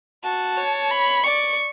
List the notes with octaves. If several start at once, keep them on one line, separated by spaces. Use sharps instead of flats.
F#4 A5
C#5
B5
D5 C#6